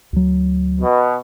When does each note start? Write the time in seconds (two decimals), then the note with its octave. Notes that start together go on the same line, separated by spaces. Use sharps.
0.13 D2 F#3
0.80 B2